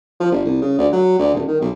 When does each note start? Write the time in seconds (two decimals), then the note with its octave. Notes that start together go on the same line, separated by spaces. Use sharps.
0.20 F3
0.32 G1
0.45 C2
0.61 C#3
0.78 D2
0.92 F#3
1.19 D2
1.34 D#1
1.47 D#3
1.61 B1